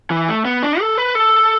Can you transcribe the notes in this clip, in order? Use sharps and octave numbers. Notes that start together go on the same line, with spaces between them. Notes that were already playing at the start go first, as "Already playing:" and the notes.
E3
A3
B3
D4
A4
B4
A4